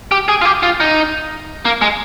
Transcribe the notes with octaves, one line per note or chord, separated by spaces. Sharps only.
G4
G#4
F4
G4
F4
D#4
A#3
G#3